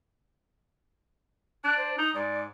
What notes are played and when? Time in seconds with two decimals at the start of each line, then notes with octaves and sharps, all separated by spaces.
1.64 D4 F#6
1.78 C5
1.98 D#4 D#6
2.15 G#2 D5